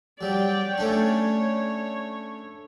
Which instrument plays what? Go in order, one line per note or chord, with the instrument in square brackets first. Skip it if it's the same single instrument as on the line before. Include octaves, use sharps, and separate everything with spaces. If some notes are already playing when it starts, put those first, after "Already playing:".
[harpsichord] F#3 G3 [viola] D5 G5
[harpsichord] A3 C#4 D4 [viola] C#5